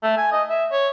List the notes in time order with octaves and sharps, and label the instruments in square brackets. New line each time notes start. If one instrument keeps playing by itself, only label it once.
[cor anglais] A3
G#5
D#5
E5
C#5